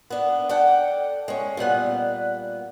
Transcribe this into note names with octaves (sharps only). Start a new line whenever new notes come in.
B3 D4
A4 D5 F#5 G5
G#3 C#4
A#2 G3 B3 F#5